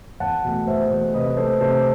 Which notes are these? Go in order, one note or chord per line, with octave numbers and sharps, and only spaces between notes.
E2 F#5 A5
B2 A3
E2 C5 E5
B2 A3
C3 B4 D#5
E3 A3 A4 C5
C3 A4 C5